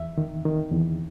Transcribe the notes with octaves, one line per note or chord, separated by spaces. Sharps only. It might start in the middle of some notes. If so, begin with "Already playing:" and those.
Already playing: E2 E5
D#3
D#3
E2